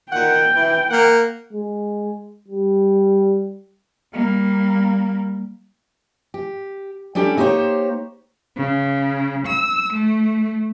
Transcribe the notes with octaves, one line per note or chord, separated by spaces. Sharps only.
A#2 D#3 F#5 G5
E3
A#3 F#5
G#3
G3
G3 A#3
G4
G3 C#4 D4 G4 A4
A#3 D#4 G4 A#4 C5 C#5
C#3
E6
A3